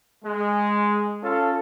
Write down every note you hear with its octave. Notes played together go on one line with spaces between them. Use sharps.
G#3
C#4 F4 A4